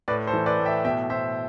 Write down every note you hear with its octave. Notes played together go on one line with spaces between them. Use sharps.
A2 B4 D5
A4 C5
E3
B4 D5
A2
E5 G5
B2 E5 G5
B2 C5 E5